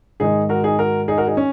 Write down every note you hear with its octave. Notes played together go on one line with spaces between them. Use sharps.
G#2 D#3 G#3 D#4 G#4
F#4 A#4
D#4 G#4
F#4 A#4
D#4 G#4
F#4 A#4
D#4 G#4
C#4